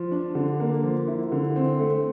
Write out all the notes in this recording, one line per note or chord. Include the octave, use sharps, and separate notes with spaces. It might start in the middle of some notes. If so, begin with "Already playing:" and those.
Already playing: F3
D4
D3
A#3
F3
E4
D3
C4
A3